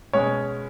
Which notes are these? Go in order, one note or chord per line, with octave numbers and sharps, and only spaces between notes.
B2 G#3 C#4 C#5